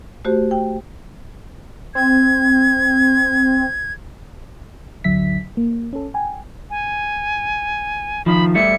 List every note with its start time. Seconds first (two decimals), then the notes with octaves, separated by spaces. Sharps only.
0.25 A3 F#4 G4 C5
0.51 G5
1.95 C4 G#6
5.04 G#1 D2 D3 F#3 E5 B6
5.57 A#3
5.93 C#4 A4
6.14 G5 G#5
6.70 G#5
8.26 D#3 F3 B5
8.55 G3 A3 E4 C#7